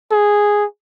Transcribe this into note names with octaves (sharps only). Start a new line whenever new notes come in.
G#4